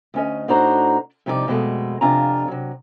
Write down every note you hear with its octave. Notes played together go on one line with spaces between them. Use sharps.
D2 C#4 D#5
A2 D4 D#4 F#4 C5 A#5
G2 C3 F3 D#4 G#4 D5
F2 B2 D#3 G#3 A3
F2 C3 D4 F4 G#5 A#5
C3 F#3